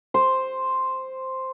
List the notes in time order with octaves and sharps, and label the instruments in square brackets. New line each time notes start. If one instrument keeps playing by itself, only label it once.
[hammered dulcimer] C5